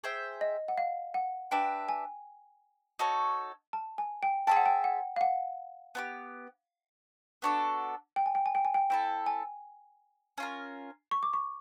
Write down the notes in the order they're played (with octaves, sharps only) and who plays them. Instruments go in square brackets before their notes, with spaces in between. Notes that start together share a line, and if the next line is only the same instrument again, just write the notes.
[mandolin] G#4 C5 E5 G5
[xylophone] D#5
F#5
F5
F#5
[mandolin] D4 G4 B4 E5 [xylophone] G5
[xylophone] G#5
[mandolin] D#4 F#4 A4 C#5
[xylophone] A5
G#5
G5
[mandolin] G#4 C5 E5 A5 [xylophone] G5
[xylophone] F#5
G5
F#5
F5
F#5
[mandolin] B3 E4 G4
B3 D4 F#4 A4
[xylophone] G5
G#5
G5
G#5
G5
G#5
G5
[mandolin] C4 E4 A4 [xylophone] G5
[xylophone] G#5
[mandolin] C#4 F4 A#4
[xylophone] C#6
D6
C#6